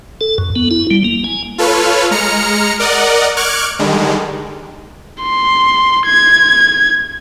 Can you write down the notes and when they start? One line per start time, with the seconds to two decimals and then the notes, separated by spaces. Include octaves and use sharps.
0.21 A4
0.38 F#2
0.56 B3
0.71 E4
0.91 G3
1.04 A#3
1.24 G#5
1.58 F4 A4 B4 C#5 F6
2.11 G#3 A#5 F6 C#7
2.79 A#4 D5 D#5 F#5
3.37 C#6 D6 F6 F#6 G#6
3.79 D3 D#3 G3 G#3
5.22 C6
6.06 G#6